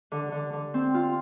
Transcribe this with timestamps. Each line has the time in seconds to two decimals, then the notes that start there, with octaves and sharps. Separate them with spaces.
0.12 D3
0.32 D3
0.53 D3
0.74 C4
0.94 F4